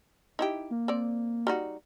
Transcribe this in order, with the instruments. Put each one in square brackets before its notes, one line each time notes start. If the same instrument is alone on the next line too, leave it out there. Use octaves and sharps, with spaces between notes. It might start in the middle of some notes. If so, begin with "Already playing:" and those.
[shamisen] D#4 E4 G4
[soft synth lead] A#3
[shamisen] C4 D5
G3 D#4 F#4